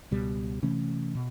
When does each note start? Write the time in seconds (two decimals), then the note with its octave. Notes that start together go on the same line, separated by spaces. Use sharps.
0.11 C#2 B2 G3
0.62 C3 E3 A3 C#4
1.15 B2